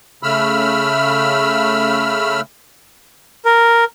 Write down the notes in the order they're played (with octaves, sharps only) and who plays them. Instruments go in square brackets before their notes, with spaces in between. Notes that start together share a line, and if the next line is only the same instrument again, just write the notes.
[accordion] C#3 A3 B5 E6 F6
[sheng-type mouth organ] A#4